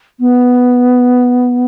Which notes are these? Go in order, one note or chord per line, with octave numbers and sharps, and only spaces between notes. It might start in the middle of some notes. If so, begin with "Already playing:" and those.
B3